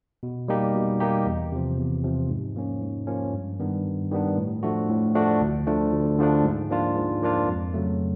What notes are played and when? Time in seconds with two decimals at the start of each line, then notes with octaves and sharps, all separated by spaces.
0.23 B2
0.48 G3 A#3 D#4 G4
0.74 B2
1.00 G3 A#3 D#4 G4
1.26 E2
1.52 C3 F3
1.78 E2
2.04 C3 F3
2.30 G#2
2.56 F3 A#3 C#4
2.82 G#2
3.07 F3 A#3 C#4
3.33 G2
3.60 D#3 G3 B3 D4
3.85 G2
4.11 D#3 G3 B3 D4
4.37 A2
4.63 F3 A3 D4 F#4
4.89 A2
5.15 F3 A3 D4 F#4
5.41 D2
5.66 D3 F3 A3 D4
5.93 D2
6.19 D3 F3 A3 D4
6.44 G#2
6.70 F3 A#3 D4 F4
6.96 G#2
7.22 F3 A#3 D4 F4
7.48 F2
7.74 C#3 F#3 A3